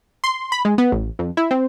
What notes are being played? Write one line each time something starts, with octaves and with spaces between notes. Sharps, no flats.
C6
B5
G#3
B3
A1
F2
E4
C4